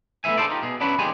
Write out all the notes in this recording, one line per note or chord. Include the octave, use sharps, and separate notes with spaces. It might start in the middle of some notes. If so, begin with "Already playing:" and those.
A3 B3 C#4 E4 E5 G#5
D4 G#4 A4 C5 D5
D#4 F4 G4
B2 G#4
B3 C#4 D4 E4 F#4 B4
D#2 G#3 G4 D5 G#5